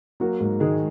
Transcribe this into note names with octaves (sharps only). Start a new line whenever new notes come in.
F#3 A#3 F#4
G#2
D#3 G#3 G#4